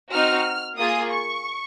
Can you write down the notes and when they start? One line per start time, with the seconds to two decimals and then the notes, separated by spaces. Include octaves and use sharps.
0.12 C4 D#4 F#4 F6
0.77 A#3 F4 G#4 D#6
1.10 C#6